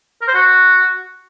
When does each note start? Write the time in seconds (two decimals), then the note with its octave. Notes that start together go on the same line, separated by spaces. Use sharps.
0.21 A#4
0.28 C5
0.34 F#4